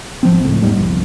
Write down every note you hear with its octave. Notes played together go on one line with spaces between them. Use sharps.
G#1 F3 C4
C#2 A2
E2 G#2 G3
G1 C2 F2